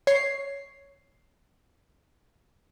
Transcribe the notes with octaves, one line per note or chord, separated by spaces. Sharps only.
C#5 C7